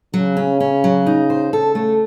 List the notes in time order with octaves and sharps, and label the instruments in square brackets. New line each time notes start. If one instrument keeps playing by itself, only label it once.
[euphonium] C#3 [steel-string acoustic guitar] F#3
[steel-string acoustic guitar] C#4
C#4
F#3
D#4
C5
[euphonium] C#3 [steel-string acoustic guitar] A4
[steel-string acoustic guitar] A3